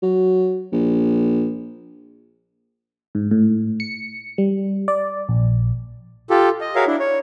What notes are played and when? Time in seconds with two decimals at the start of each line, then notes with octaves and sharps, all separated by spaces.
0.03 F#3
0.72 A#1
3.15 G#2
3.31 A2
3.80 C#7
4.38 G3
4.88 D5
5.29 A#1
6.30 F4 G4 A4
6.61 D#5
6.75 F#4 G#4 A#4 C#5 E5 F5
6.87 D4 E4
6.99 C#5